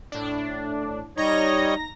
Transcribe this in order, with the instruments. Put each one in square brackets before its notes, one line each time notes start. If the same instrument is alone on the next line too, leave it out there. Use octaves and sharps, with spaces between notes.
[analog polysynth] A2 D4
[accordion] G3 C#5 D#5 [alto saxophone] D#4 [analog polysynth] A#5 A#6